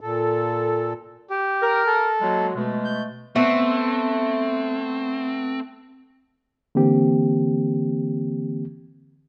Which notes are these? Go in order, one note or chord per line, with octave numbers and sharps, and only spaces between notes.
A#2 A4
G4
A#4
A4
F#3 G#3 A#3
B2 G#3 A3
G6
A3 B3 C4
D3 E3 A#3 C4 G4